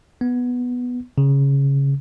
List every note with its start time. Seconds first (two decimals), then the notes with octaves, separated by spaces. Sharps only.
0.21 B3
1.18 C#3